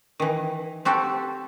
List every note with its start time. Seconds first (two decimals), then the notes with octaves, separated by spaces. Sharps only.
0.20 D#3 E3
0.85 C4 F#4 G4 A4